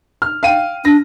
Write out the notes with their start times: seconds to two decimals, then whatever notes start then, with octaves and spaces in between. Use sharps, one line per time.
0.22 F6
0.43 F5 G5 D#7
0.85 D4 A#6